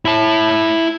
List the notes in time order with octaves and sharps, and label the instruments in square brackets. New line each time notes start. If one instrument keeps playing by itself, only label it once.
[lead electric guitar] E4 A5